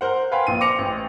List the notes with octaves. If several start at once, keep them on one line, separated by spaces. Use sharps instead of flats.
A#4 C5 F#5
B4 F5 G5 G#5 B5 C6
A#1 D#7
C5 D6 A#6 C#7 F7
A1